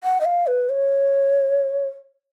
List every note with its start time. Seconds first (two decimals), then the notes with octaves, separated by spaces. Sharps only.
0.04 F#5
0.21 D#5
0.25 F5
0.47 B4
0.69 C#5